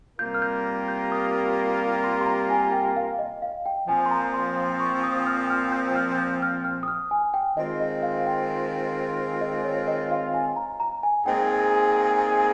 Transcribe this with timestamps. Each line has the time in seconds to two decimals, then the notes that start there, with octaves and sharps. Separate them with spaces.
0.19 C3 G3 A#3 F4 A#4 G6
0.34 F6
0.42 G6
0.88 G6
1.12 D#6
2.04 C6
2.21 C6
2.26 A#5
2.50 G#5
2.72 G5
2.96 F5
3.19 D#5
3.42 F5
3.66 G5
3.88 A#2 F3 C4 G#5
4.06 C6
4.11 A#5
4.34 C6
4.80 C#6
5.03 D#6
5.27 F6
5.50 F6
5.72 G6
5.96 F6
6.18 G6
6.42 F6
6.64 F6
6.83 D#6
6.88 F6
7.11 G#5
7.34 G5
7.57 D#3 G#3 C4 F4 D#5
7.80 D#5
8.03 F5
8.26 G5
9.41 D#5
9.64 C#5
9.88 D#5
10.11 F5
10.34 G#5
10.56 A#5
10.80 A#5
11.03 G#5
11.26 A#2 G#3 C4 D#4 G#4 G5
12.18 G#5